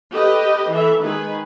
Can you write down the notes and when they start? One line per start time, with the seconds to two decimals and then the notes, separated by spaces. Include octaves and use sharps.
0.12 G4 A4 B4 D#5
0.71 E3 A4 E5
1.03 D#3 G#3 G#4 B4